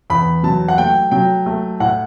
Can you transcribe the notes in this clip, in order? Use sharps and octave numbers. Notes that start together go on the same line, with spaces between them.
E2 B5
F#3 A5
F#5
A3 G5
F#3 G5
A3
A2 F#5